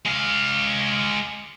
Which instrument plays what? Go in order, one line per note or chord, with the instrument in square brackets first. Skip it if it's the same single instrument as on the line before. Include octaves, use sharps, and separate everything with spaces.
[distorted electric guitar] G#3 F5